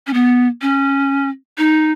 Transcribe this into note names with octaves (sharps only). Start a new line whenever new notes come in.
C#4
B3
C#4
D#4